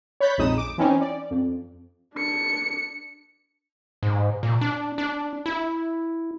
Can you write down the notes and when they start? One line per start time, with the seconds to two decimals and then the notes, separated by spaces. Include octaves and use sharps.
0.21 C#5 B5 F#6 G6 A6 B6
0.38 A#1 F2 G#3 D#4 D#6 E7
0.58 D6
0.78 E3 C4 C#4 D#4
1.01 D5
1.31 F2
2.15 D4 C#7
4.03 G#2
4.43 A#2
4.61 D4
4.98 D4
5.46 E4